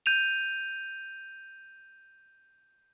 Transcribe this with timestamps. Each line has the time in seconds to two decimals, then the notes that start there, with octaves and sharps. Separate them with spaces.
0.06 G6 D#7 F7